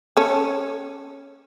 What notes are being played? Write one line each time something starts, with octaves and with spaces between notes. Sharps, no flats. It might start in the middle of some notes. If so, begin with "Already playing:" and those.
C#4 A4